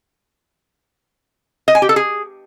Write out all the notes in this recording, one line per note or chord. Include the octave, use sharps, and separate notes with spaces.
D#5
G#5
G4
A4
G#4